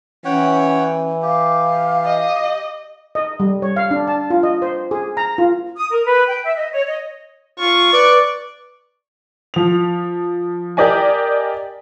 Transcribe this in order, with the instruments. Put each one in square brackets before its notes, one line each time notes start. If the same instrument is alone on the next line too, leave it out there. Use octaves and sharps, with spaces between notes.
[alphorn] E3 [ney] C#4 [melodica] C#5 F#5 G5
[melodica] G4 [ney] F5
[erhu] D#5
[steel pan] D#5
G3
C#5
F5
D4
A5
F4
D#5
C5
G#4
A#5
F4
[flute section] D#6
A#4
B4
G5
E5
D#5
C#5
D#5
[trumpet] F4 [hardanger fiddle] C#6
[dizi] B4 [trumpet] D5
[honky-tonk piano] F3 F7
G4 A#4 D5 D#5 G#5